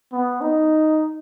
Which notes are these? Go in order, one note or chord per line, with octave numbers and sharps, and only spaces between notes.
B3
D#4